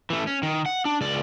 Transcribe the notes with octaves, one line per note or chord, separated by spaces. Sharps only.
E3 A3
C#4
D#3
F#5
D4
C#2 D5